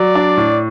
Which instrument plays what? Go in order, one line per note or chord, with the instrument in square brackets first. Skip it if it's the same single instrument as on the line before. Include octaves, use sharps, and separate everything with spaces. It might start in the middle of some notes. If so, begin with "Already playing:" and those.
Already playing: [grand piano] F#3 [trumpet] D5
[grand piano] D4
A2